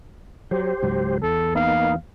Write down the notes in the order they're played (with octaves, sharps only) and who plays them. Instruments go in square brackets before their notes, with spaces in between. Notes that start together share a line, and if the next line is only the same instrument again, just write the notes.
[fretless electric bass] F#3 [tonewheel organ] G4 C5
[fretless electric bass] C#2 G#2 F#3
[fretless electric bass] E2 [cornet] A4
[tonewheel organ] A#3 B3 D#4 [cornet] F5